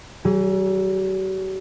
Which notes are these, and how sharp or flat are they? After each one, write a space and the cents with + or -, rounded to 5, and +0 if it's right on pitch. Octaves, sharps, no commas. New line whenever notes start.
F#3 +45 G#4 +0